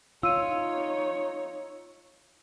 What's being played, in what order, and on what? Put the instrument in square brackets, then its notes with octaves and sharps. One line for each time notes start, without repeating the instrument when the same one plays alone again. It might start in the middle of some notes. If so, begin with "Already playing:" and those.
[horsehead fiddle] D#4 C#5 [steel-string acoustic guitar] F4 [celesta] E6 D#7